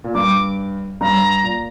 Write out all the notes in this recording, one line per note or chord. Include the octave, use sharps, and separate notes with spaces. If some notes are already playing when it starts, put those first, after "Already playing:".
A#2
G2 D6
G2 A#5
A#2